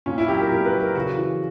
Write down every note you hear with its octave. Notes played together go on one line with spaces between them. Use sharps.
A#2 C#4
E4
F#3 G4
A#4
A#2 A#4
B4
F#3
A#4
C#3 F#4
E3